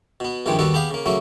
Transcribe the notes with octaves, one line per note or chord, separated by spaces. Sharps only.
B2 B3
A#1 G2 C3 D#3 G3 G#3
D#2 G3 B3 F#4 A4
B3 G4 G#4 F5
C#3 A#3
C#3 F#3 A3 A#3